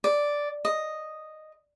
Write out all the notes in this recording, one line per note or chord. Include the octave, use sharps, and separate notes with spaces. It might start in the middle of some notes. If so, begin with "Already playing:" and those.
D5
D#5